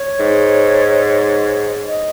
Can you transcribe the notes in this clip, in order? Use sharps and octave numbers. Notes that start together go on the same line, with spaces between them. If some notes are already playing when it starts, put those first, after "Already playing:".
Already playing: C#5
G#2
D#5